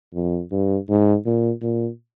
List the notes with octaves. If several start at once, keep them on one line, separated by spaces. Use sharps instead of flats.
F2
G2
G#2
A#2
A#2